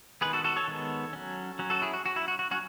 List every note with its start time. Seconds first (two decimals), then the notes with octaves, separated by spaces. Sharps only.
0.21 D#3 G#3 B3 G#4 B4
0.33 F#4 A4
0.44 F#4 A4
0.56 A4 C#5
0.68 D#3 G#3 B3
1.13 F#3 C#4
1.59 F#3 C#4
1.70 F#4 A4
1.81 E4 G#4
1.94 F#4
2.04 F#3 C#4 F#4
2.16 E4
2.28 F#4
2.39 F#4
2.51 F#3 C#4 F#4